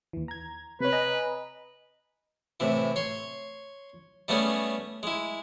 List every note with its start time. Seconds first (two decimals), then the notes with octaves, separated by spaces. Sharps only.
0.13 D#2 E3
0.28 A#5 G#6
0.80 C3 B4 C#5
0.92 D#5 G#5 A#5
2.60 A2 C3 E3
2.96 C#5 C6
4.28 G3 A3 B3 C#4 G#4
5.03 G#3 E4